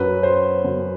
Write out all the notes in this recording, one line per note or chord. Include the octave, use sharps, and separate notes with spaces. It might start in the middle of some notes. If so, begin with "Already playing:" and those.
Already playing: F#2 F#3 B4
C5
F#2 F#3